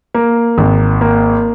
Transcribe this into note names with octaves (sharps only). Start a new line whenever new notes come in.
A#3
G#1
A#3